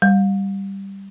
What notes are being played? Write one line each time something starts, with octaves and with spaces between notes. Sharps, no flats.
G3